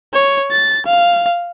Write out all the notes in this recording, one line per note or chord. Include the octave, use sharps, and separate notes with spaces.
C#5
A6
F5